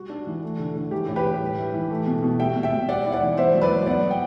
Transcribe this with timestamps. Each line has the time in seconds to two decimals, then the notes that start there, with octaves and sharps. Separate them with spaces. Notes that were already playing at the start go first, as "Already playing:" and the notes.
Already playing: G3 F#4
0.09 D4
0.27 E3
0.43 A3
0.59 D3
0.75 D3
0.91 E3 G4
1.08 A2
1.16 G4 B4
1.25 A2
1.42 G3
1.58 E4
1.74 E3
1.90 A3
2.07 B2
2.22 B2
2.39 G3 E5 G5
2.56 B2
2.63 E5 G5
2.71 B2
2.88 G3 D5 F#5
3.05 E4
3.12 D5 F#5
3.21 E3
3.37 B3 C5 E5
3.55 F#3
3.62 B4 D5
3.71 F#3
3.86 B3 D5 F#5
4.03 F#3
4.11 G5